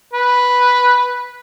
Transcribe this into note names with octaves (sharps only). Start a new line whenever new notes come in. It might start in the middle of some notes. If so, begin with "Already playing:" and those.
B4